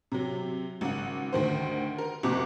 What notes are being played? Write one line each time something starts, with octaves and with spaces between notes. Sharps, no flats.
C3 F#3
G#1 C#3 F#5
D2 D#3 C5
A#4
F#1 C3 F#4 D6